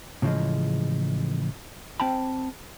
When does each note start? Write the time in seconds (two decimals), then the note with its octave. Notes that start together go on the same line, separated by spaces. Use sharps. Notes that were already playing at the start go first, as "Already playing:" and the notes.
0.22 A2 C#3 E3 F3 G#3
2.00 C4 G5 A5 B5